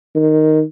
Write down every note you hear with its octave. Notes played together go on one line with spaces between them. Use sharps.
D#3